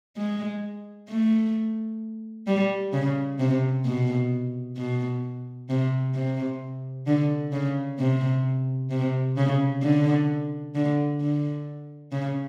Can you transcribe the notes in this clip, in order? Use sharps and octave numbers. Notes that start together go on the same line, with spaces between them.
G#3
A3
G3
C#3
C3
B2
B2
C3
C3
D3
C#3
C3
C3
C#3
D3
D3
D3
C#3